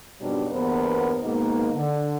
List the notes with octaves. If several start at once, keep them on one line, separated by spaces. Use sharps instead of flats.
F2 G#2 B2 F#3 G3 D4
E2 G2 A#3 B3 A#4 C5
G#2 B2 D#3 A#3
D3